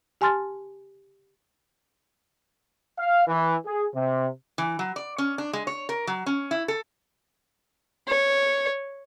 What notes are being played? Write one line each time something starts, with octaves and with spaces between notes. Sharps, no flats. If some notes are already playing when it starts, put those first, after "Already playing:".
G4 G#5 A5 C6 F6 A6
F5
E3
G#4
C3
E3
F#3
D5
C#4
D4
G#3
C#5
A#4
F#3
C#4
E4
A4
C#5